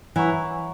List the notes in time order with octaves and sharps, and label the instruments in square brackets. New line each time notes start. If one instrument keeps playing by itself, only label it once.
[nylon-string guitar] E3 [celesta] C#5 F#5 A#5 C#6